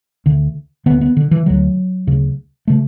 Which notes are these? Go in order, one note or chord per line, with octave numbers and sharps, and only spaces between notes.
D2 D3
D2 D3 B3
B3
D3
E3
D2 D3 F#3
D2 C#3
C#3 A3